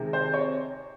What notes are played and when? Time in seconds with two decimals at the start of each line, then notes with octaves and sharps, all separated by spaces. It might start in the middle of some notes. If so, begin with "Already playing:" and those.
Already playing: C3 D#3 G#3
0.13 C5
0.34 C#5